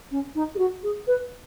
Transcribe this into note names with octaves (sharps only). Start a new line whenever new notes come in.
C#4
D#4
G#4
F#4
G#4
B4